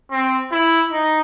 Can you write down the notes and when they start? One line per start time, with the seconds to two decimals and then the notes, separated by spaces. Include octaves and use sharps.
0.11 C4
0.52 E4
0.92 D#4